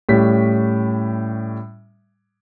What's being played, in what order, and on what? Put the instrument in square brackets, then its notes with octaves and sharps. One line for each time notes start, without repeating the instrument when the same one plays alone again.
[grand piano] A2 G3 C#4 B6